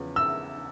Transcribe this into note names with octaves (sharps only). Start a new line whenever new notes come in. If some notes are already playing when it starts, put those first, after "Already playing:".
Already playing: E2 C#3 F3
E6